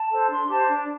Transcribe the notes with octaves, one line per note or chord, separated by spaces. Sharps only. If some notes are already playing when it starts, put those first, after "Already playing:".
Already playing: A5
A4 C5
D4 C6
G4 C5 A5
D4